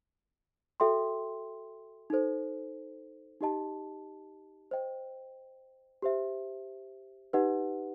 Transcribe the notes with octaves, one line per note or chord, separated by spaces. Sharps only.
F#4 A4 E5 G5 C6
D#4 A4 C5
D#4 G4 D#5 A5
C5 D#5 G5
G4 C5 E5
D#4 G4 B4 D#5 F#5